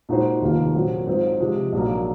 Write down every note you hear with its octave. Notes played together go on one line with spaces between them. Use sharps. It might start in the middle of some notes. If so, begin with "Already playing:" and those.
A#2 G#3 D#4 F#4 C5
F1 D#2 D#3 A#3 F4
A#2 F#3 C4 F#4
G#2 F#3 C4 F4
C3 F3 G#3
A#1 G#2 F#3 A#3